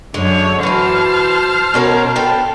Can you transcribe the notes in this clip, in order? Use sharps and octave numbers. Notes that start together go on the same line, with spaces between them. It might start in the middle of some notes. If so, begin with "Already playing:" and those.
F#2 D3 G#3 C#5
E3 F#4 C5 A5 F6
B2 C#4 A#4
B3 A4 G5